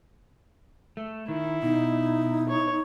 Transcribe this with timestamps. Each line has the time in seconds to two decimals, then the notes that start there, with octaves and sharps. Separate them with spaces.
0.97 A3
1.28 D#3 E4
1.63 B2 D#4
2.49 C#5